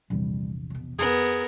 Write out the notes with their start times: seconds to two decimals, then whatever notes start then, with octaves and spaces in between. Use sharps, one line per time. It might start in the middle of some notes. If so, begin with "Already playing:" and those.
0.10 A#1 E2 C3 G3
0.70 B2 B3
0.99 F2 B3 G#4 A#4